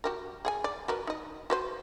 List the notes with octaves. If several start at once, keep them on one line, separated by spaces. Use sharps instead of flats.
F#4 G4 A#4
G#4 F#5 G#5
D5
F#4 A#4 B4
D#4 D#5
F#4 B4 C5